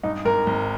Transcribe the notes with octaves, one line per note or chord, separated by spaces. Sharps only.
G2 D#4
G#1 A#4
G#1